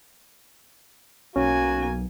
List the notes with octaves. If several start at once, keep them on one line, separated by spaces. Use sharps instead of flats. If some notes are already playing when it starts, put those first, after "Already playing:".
B1 A#3 C#4 F#4 G#5